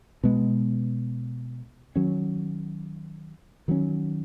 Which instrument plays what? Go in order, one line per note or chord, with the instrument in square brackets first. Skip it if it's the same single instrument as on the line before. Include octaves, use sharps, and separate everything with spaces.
[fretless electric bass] B2 G#3 B3
D#3 F#3 C#4
D#3 F#3 C#4